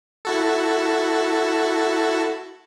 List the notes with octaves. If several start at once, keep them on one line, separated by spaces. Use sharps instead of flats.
E4 F#4 A4